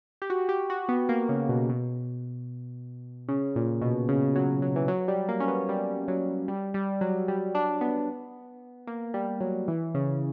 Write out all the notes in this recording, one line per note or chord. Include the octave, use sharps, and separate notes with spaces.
G4
F#4
G4
F#4
B3
A#3
C#3
B2
B2
C#3
A#2
B2
C#3
F#3
F#3
E3
F#3
G3
A#3
C#4
B3
G3
F#3
G3
G3
F#3
G3
D4
B3
A#3
G3
F#3
E3
C#3